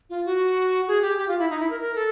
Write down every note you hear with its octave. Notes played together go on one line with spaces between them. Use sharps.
F4
F#4
G#4
G4
G4
F4
E4
D#4
E4
A#4
A#4
A4